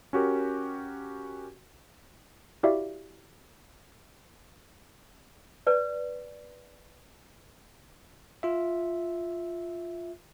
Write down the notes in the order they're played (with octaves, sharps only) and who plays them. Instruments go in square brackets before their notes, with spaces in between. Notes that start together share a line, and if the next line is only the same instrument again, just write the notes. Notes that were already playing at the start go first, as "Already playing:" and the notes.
[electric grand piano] C#4 F#4 G4 A#4
[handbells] E4 F#4 G4 D5 E5 F5
[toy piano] B4 D5
[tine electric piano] F4 E5